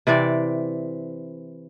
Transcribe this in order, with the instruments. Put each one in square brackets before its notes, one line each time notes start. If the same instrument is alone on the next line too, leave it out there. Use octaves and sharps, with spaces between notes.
[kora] C3 E3 C4 D5